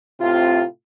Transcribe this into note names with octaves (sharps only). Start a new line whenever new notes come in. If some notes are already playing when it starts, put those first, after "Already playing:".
A2 C3 C4 F4